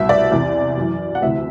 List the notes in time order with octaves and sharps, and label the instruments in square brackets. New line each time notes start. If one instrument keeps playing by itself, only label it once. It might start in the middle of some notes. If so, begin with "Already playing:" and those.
Already playing: [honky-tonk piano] C2 B2 E5
D5
E2 C3 E3
F#2 E3
F#5
D2 C3 E3 E5